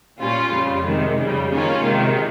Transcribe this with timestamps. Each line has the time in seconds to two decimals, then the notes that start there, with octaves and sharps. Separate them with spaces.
0.19 A#2 G3 C#4 F4
0.52 F2 C#3 G3
0.86 C3 D#3 G#3
1.18 F2 C#3 G3
1.52 D#3 A#3 C#4 F4
1.85 C3 D#3 G#3